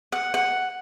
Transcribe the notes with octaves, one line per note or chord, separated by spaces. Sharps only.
F#5
F#5